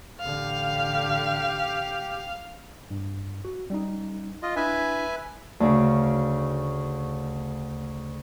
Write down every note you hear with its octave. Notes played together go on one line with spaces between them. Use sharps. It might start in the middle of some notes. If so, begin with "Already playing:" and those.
A1 D3 G4 F5
G2
F#4
G3 C#4 D#4
F4 D#5
D4 E4 B4 E5 G#5
D2 C#3